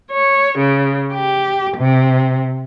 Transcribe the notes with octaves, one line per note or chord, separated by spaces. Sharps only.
C#5
C#3
G4
C3